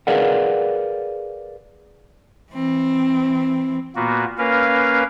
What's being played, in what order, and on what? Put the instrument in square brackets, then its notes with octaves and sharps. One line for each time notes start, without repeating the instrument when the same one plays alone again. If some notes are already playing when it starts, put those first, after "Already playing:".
[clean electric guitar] G#4 A#4 B4 D5 F5 F#5
[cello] E3 C4
[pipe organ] A#2 A#3 B3 F#4
A#3 C#4 A#4 B4 F5